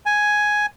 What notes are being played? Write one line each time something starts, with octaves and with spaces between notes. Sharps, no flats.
G#5